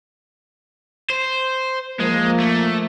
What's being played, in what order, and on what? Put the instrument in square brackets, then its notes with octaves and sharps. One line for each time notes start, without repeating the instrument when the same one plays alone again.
[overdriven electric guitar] C5
[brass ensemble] F3 A#3 [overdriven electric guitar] G#3
[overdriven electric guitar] A3